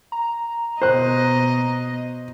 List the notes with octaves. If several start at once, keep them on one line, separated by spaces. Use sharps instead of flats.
A#5
B2 C5 D#5 F#6